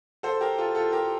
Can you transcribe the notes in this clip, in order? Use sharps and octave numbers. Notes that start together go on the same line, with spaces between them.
A4 C5
G4 A#4
F4 A4
F4 A4
G4 A#4